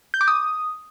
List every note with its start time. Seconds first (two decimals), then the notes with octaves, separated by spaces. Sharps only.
0.14 G6
0.21 D6
0.28 D#6